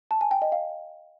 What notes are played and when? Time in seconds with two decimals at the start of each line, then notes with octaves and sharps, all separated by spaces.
0.11 A5
0.21 G#5
0.31 G5
0.42 D#5
0.52 F5